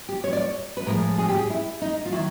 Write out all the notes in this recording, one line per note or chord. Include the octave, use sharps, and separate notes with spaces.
G4
C#5
D5
C#5
B4
A2 F3 G#3 A#4
G#4
G4
G#4
E4
D#4
F4
D#3 F#3 E4